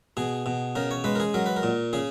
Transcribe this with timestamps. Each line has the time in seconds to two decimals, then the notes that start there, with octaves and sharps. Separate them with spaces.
0.17 B2 G#4
0.46 B2
0.75 C#3 A#4
0.91 C#5
1.04 G#3 B4
1.15 A#4
1.20 G#4
1.34 F#3 A#4
1.46 B4
1.56 A#4
1.63 A#2
1.93 C#3 G#4